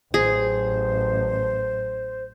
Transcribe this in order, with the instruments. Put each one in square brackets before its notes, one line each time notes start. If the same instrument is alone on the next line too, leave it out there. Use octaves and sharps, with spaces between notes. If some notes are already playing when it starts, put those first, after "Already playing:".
[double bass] A1 F#3 [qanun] G#4 [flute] C5